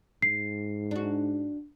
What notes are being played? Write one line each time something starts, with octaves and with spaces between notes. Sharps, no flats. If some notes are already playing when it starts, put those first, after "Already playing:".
G#2 C7
D4 F#4